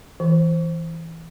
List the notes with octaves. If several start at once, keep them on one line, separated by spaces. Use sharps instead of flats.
E3